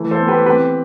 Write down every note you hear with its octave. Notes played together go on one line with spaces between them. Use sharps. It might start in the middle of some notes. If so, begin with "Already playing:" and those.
Already playing: E3 A3
A4 C5
B3
G4 B4
C4 G4 B4